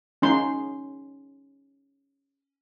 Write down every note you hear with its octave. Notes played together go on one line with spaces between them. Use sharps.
C#4 D#4 C6